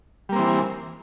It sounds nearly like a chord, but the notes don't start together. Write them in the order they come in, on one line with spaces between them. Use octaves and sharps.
G3 A#3 C4 E3